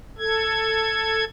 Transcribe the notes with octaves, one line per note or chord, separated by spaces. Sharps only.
A4 G#6